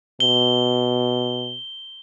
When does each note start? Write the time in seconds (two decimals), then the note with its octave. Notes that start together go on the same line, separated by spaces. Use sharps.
0.20 B2 G7